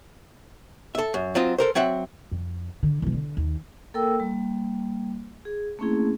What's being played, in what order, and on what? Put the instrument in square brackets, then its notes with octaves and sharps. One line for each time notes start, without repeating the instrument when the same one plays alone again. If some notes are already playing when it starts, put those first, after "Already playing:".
[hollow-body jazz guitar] A4 E5
F#2
F#3 C4 F4 D#5
A4 A#4 C5
F#3 C4 E5 F#5
[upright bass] F2
D3
E1 F3
D3
D#2
[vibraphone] A#3 A4 A#4 G5 E6
G3 A#3
G#4
A3 A#3 C4 C#4 E4 G#4